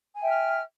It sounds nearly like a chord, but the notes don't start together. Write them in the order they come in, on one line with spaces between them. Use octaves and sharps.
G#5 G5 E5 F6